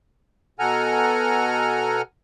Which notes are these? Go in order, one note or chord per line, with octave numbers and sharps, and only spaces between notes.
B2 A4 F#5 G#5 A#5 F6